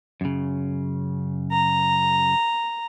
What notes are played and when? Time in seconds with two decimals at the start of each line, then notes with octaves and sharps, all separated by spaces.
0.21 F#2 C#3
1.51 A#5